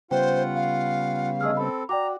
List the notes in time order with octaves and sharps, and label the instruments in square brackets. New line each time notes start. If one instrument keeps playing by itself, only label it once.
[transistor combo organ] C#3 G3 B3 [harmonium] F4 F#5 [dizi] C5 [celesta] G5
[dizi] F5
[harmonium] D3 A3 G#4 [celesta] D#5 E6 F6
[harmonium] C4 A4 [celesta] B5
[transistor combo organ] F#4 [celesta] D5 G5 D6 [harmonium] A#5